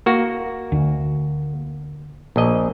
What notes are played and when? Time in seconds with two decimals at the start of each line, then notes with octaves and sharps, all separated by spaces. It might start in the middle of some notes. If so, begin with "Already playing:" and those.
0.06 A#3 F#4
0.72 D2
2.36 A#1 D#5